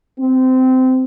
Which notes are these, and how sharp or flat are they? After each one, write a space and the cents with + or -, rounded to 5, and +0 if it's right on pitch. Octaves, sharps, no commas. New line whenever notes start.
C4 -20